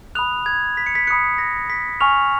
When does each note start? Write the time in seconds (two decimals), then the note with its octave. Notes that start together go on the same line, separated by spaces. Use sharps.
0.15 B5 D#6 F#6 F7
0.46 G#6
0.77 B6
0.86 C#7
0.95 B6
1.07 B5 D#6 F#6 C#7
1.38 A#6
1.70 B6
2.01 G#5 C#6 F6 F7